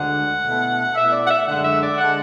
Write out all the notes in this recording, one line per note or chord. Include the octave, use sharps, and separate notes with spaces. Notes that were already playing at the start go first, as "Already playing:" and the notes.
Already playing: D2 D3 G#3 D4 F#5
B2 A3 E4
B2 A3 E4 E5
D5
F#5
E5
F#2 D3 G#3 D4 F#5
E5
D5
D3 G#3 D4 F#5